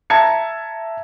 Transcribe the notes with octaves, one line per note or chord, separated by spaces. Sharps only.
E5 A5 A#5 G#6 C#7